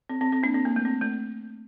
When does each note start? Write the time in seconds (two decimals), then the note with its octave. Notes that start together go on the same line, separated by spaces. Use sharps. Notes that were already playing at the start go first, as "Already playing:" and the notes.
0.09 C4
0.21 C4
0.32 C4
0.43 A#3 D4
0.54 C4
0.65 A#3
0.76 A3
0.85 C4
1.01 A3